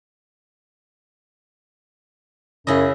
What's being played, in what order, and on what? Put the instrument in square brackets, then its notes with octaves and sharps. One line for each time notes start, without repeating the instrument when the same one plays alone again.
[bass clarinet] F#2 [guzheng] C#3 E4 D#5